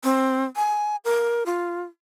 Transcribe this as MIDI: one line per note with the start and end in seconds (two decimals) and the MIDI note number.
0.04 0.44 60
0.56 0.96 80
1.05 1.44 70
1.46 1.83 65